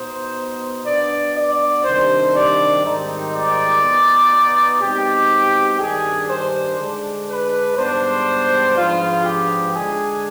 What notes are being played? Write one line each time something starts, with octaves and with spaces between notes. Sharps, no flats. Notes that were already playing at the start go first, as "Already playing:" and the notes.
Already playing: B2 B3 D#4 C5
B2 B3 D4 D5
D5
C3 D#3 G3 D4 C5
D5
G#2 D#3 G3 C4 D#4
D5
B2 B3 D#4
B2 G#3 C4 D#4 G4
G2 D#3 G3 D4 G#4
C5
D3 G#3 D4
B4
G#2 G3 B3 D4 C5
G#2 F3 G#3 B3 D4 F4
G4
D3 G#3 D4 G#4